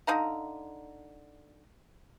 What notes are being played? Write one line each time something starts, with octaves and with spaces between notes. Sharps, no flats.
D3 D#4 F5 A#5